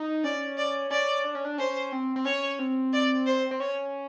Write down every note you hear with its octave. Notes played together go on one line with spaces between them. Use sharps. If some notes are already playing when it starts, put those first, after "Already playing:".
Already playing: D#4
C#4 D5
D5
C#4 D5
D4
C#4
D4
C#4 C5
C4
C4
C#4 C#5
C4
D5
C5
C4
C#4 C#5